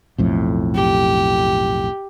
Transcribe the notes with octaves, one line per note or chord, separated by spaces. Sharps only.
B1 F2 A2
G4